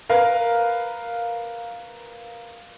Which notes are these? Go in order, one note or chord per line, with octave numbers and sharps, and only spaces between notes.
A#4 B4 F5